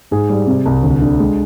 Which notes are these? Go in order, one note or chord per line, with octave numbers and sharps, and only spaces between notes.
G#2 G#4
G3
C3
C2
D2
D3
G#3